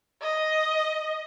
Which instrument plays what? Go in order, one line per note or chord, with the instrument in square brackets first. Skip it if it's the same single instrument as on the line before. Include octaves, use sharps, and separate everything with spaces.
[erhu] D#5